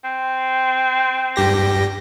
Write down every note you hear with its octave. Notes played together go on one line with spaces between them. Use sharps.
C4
G2 G4 A#6